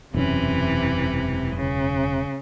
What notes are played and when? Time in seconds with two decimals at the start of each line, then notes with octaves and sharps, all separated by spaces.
0.14 E1 F#2 C3 E3 C#4
1.55 C#3